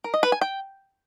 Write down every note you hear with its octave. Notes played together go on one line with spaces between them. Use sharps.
A#4
D#5
B4
G#5
G5